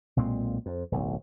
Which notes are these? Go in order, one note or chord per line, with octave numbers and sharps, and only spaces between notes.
B1 A#2 G#3 C4
F2
D1 B1